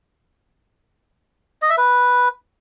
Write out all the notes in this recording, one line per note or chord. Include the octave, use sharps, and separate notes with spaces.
D#5
E5
B4